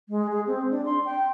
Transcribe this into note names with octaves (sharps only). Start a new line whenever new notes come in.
G#3
G#4
C4
D4
C6
G5